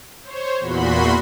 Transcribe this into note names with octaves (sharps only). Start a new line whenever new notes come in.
C5 C#5
E2 A#2 F#4 B5 C6